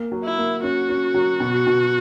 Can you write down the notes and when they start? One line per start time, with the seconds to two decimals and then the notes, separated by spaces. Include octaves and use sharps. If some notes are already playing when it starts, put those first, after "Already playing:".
Already playing: A#3
0.12 F#3
0.24 E4
0.38 A#3
0.63 C#4 F#4
0.89 C#4
1.14 F#3
1.40 B2
1.67 B2